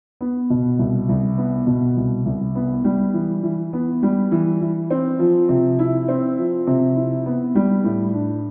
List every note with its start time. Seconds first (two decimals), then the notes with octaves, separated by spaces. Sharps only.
0.21 B3
0.50 B2
0.79 C2
1.09 C2
1.38 B3
1.67 B2
1.97 C2
2.25 C2
2.55 B3
2.84 G3
3.14 E3
3.43 E3
3.73 B3
4.03 G3
4.32 E3
4.61 E3
4.91 C4
5.19 F3
5.49 C3
5.79 E4
6.08 C4
6.38 F3
6.67 C3
6.96 E4
7.26 B3
7.55 G3
7.84 A2
8.14 D4